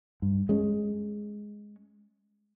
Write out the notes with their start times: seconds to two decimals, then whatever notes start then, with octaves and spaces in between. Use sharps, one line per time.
0.22 G2
0.49 G#3 C#4